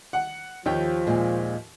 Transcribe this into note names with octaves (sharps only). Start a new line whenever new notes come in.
F#5
D#2 F3 G4 C#5 G5
A#2 G#3